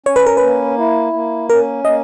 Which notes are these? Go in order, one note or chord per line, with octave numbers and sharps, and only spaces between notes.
C#4 C#5
B4
A#4
A#3 B4
E4
A#3
C#4 A#4
A#3 D#5